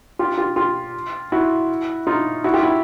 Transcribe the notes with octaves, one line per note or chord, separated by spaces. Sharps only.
F4 G4
F4 G4
F4 G4
E4 F#4
D#4 F4
E4 F#4
F4 G4
E4 F#4